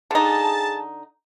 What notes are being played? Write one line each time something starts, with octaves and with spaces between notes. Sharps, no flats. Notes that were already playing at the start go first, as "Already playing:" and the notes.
D3 D#4 G#4 A5